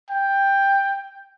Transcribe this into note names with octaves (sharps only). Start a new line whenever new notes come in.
G5